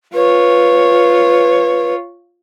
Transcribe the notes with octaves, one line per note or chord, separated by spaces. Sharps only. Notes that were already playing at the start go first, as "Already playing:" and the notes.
F4 B4 C#5